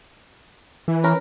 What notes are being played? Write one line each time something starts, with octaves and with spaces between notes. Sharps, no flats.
E3
C#4 A#4 B4